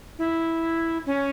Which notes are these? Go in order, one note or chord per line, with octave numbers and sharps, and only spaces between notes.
E4
C#4